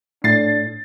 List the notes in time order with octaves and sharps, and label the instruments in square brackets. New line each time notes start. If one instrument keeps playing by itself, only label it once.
[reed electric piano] A2 [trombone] D4 [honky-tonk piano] A6 C7